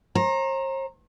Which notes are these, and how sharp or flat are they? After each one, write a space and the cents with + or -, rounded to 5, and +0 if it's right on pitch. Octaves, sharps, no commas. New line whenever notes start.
C5 +45 A#5 +0